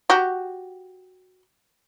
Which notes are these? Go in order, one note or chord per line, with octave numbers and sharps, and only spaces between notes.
F#4 G4